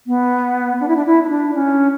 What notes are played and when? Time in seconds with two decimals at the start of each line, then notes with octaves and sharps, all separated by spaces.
0.07 B3
0.80 D4
0.88 E4
0.96 D4
1.06 E4
1.23 E4
1.29 D4
1.55 C#4